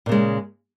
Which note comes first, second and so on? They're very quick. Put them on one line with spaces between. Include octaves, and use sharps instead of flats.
A#2 C#3 G#3